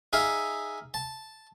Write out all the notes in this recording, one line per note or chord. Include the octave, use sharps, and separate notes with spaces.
D#4 G#4 E5 F5
A5